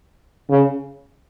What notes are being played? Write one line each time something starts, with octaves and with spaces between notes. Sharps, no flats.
C#3